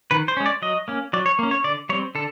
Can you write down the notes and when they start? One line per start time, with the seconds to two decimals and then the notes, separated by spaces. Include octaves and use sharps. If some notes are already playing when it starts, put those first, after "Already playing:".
0.11 D#3 B4
0.28 C5
0.37 G#3 C#4
0.46 D5
0.62 F#3 D#5
0.88 A#3 C#4
1.13 F#3 D5
1.26 C#5
1.39 A#3 C#4
1.51 C#5
1.64 D3 D5
1.89 G3 C4 C#5
2.15 D3 A4